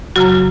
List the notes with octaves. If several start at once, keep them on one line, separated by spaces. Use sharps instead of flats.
F#2 C#3 F#3 F#4